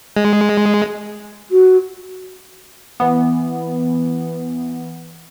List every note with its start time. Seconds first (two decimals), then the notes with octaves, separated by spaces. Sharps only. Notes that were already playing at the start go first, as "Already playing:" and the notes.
0.16 G#3
1.51 F#4
3.00 E3 B3